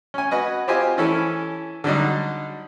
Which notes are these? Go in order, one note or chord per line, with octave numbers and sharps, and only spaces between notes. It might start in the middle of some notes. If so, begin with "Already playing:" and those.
C#4 G#5
F#4 B4 D#5
C4 F4 G4 C5 D#5 G#5
E3 C#4 E4 A4
D3 F#3 G3 D#4